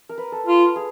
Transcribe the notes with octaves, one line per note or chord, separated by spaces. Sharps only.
A#4
B4
A4
F4
G#4